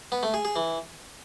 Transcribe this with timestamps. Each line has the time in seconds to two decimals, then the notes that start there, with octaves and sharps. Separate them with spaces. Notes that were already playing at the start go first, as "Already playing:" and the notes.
0.12 B3
0.23 A3
0.34 G#4
0.45 G#4
0.56 E3